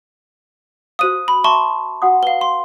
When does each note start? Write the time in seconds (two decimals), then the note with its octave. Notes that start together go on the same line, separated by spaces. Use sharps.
0.99 F#4 C5 F5 D#6 D#7
1.28 B5
1.44 E5 A5 C6 C#6
2.02 F#4 F#5 D#6
2.23 B4 F5 G7
2.41 C6